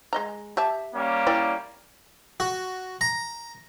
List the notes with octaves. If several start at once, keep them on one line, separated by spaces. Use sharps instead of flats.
G#3 D#5 A#5
G4 E5 A5
G3 A#3 C#4
E4 D5 G5
F#4
A#5